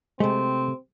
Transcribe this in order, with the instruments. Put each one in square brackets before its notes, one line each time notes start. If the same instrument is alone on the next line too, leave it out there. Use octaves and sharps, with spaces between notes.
[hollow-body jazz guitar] C3 A3 [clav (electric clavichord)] G#3 [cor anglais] C4